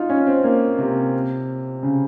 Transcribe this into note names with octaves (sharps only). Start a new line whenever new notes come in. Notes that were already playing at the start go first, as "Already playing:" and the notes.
Already playing: D#4 F4
C#4
C4
A#3
C3
C#3